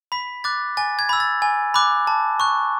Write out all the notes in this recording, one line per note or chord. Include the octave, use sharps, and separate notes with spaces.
B5 B6
D6 F#6 A6
G#5 A6
G#6
B5 E6
A6
G#5
B5 D6 F#6
A5
C#6 F#6